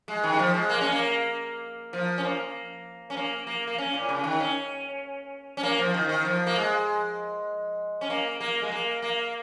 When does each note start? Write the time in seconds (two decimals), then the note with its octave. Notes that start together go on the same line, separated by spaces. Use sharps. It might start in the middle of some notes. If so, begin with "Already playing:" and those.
0.08 G#3
0.23 D#3
0.34 G#3
0.39 F3
0.54 G#3
0.69 A#3
0.81 C#4
0.92 A#3
1.93 F3
2.18 C#4
2.23 A#3
3.10 C#4
3.17 A#3
3.47 A#3
3.67 A#3
3.78 C#4
3.94 A#2
4.09 C#3
4.24 D#3
4.40 C#4
5.57 C#4
5.63 A#3
5.78 F3
5.94 D#3
6.09 D#3
6.25 F3
6.47 A#3
6.56 G#3
8.01 C#4
8.10 A#3
8.41 A#3
8.62 G#3
8.72 A#3
9.02 A#3